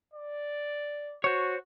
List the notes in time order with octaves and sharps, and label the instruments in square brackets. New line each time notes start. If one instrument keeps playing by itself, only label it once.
[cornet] D5
[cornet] F#4 [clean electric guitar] C5 C#5